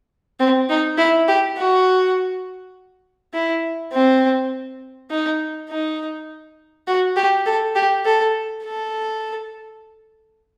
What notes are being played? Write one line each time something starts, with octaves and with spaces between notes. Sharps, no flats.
C4
D#4
E4
G4
F#4
E4
C4
D#4
D#4
F#4
G4
A4
G4
A4
A4